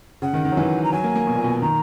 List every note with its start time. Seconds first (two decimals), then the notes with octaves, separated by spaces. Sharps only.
0.22 C#3 F#5
0.33 D#3
0.45 D#3
0.52 F#3
0.57 E3
0.84 A#5
0.93 F#3 G#5
1.04 A#3
1.16 A#3
1.27 B2
1.35 A#2
1.44 B2
1.61 D#3 A#5